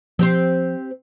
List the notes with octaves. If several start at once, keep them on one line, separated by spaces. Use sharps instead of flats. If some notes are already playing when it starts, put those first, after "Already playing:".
F3 C4 G4 C5